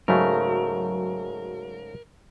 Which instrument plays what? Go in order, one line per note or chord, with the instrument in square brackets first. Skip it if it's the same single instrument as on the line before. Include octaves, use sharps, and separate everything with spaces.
[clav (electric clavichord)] G#2 C#3 A3 [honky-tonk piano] F#3 [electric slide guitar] A#4